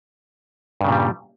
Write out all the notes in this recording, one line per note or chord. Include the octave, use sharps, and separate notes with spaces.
G2 A#2 C#3 G3